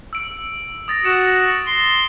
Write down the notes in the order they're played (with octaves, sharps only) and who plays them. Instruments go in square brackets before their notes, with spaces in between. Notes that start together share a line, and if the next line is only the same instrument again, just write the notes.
[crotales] E6 D7
D#6 A6 A#6
[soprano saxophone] F#4 [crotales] C#7 E7
[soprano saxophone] C6